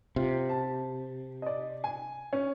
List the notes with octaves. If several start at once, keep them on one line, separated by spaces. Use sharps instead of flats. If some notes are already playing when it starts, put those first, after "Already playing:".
C3 F4
A5
D5 D#5
G#5
C#4